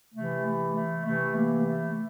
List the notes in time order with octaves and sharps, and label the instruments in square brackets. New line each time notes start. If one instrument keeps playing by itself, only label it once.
[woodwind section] C3 E3 A3
A3
A3
C3 E3 A3
A#3
A3